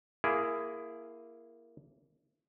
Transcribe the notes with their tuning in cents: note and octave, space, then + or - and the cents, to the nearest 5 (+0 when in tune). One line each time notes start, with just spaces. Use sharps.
A#3 +0 E4 +15 G#4 +0